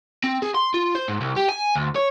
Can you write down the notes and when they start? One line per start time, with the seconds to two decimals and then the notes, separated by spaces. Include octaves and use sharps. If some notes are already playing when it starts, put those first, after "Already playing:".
0.24 C4
0.42 G#4
0.55 C6
0.74 F4
0.95 C5
1.08 G#2
1.21 C2
1.36 G4
1.49 G#5
1.75 D2
1.95 C#5